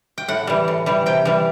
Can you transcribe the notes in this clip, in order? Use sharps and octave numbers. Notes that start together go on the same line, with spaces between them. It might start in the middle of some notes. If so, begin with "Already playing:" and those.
G5
A2 F#5
E3 G3
A2
E3 G3
C3 G5
E3 G3